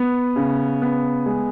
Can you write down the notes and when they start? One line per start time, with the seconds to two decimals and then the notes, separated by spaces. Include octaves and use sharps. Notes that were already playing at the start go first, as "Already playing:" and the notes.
Already playing: B3
0.36 C#3
0.82 B3
1.26 G#3